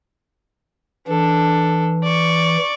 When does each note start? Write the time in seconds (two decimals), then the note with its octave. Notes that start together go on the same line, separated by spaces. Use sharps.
1.08 E3 D4 A4
2.03 D5 C#6